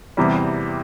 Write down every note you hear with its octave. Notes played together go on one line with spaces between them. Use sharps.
E2 C3 E3 G3